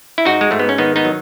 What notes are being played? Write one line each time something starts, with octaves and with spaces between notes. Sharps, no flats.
E4
G#2 D#4 F#4
G#3
G#2 A3
B3
C#4
D#3 B3 D#4
B3 D#4
F#3